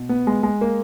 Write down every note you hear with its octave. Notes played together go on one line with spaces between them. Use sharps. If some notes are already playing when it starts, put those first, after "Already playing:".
Already playing: B2
B3
G#3
G#3
A#3